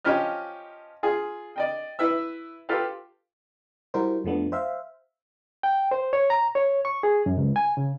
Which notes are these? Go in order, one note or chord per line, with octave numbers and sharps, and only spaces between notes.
F3 C#4 G4 D#5 F6
F4 G#4
D5 D#5 G5
E4 B4 E5 E6
F4 G4 A4 B4 F5
G3 E4 F#4 A#4 C5
F2 F3 A3 B3 D4
C5 E5 F5
G5
C5
C#5
A#5
C#5
C#6
G#4
F#2
C#2
G#5
C#3